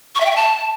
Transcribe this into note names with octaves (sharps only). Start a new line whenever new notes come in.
C#6
E5
G5
E5
A5